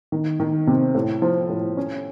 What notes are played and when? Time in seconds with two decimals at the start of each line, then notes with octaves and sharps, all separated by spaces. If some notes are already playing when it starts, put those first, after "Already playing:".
0.12 D#3
0.40 D#3
0.67 C3
0.95 A2
1.22 F3
1.50 A2
1.77 C#4